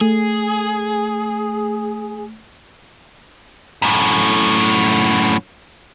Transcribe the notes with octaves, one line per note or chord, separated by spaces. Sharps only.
A3 G#4
F#2 A2